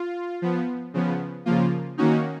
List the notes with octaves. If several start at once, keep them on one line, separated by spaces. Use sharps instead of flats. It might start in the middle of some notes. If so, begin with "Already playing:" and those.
Already playing: F4
F3 B3
C#3 F3 B3
C#3 F3 A#3 F4
D#3 A#3 C#4 D#4 F#4